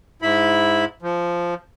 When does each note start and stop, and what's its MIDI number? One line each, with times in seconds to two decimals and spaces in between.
0.22 0.85 44
0.22 0.85 64
0.22 0.85 83
1.02 1.54 53